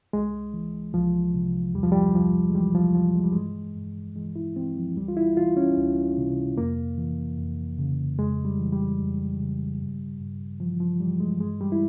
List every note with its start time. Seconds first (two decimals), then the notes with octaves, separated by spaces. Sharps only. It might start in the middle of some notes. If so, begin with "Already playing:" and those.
0.13 C2 G#3
0.54 E3
0.94 C2 F3
1.34 C3
1.74 E2 G3
1.83 F3
1.92 G3
2.14 E2 F3
2.50 G#3
2.55 E3 G3
2.75 F3
2.95 E3 F3
3.15 G#3
3.24 G3
3.32 G2 G#3
3.76 G2
4.16 E3 G#3
4.36 E4
4.56 E3 C4
4.77 F3
4.97 C#2 G3
5.08 F4
5.17 E4
5.37 E3 F4
5.57 C#4
5.78 C#2
6.18 C3
6.58 F2 A#3
6.98 E3
7.38 F2
7.79 C#3
8.18 F2 G#3
8.45 G3
8.58 E3
8.72 G3
8.99 F2
9.39 C#3
9.80 G2
10.20 G2
10.60 E3 F3
10.80 F3
11.00 E3 G3
11.20 G#3
11.40 G2 G#3
11.61 G3
11.72 E4